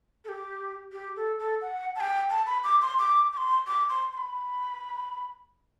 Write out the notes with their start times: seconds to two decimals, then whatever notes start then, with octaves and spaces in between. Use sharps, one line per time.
0.25 A4
0.29 G4
0.92 G4
1.16 A4
1.39 A4
1.62 F#5
1.96 A5
2.00 G5
2.30 A5
2.47 B5
2.64 D6
2.82 C6
2.99 D6
3.33 D6
3.37 C6
3.67 D6
3.89 C6
4.13 C6
4.17 B5